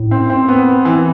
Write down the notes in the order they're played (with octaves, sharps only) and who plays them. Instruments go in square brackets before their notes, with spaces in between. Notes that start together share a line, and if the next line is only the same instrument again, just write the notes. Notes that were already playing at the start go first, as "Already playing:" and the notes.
Already playing: [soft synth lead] A2
[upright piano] C4
C4
B3
E3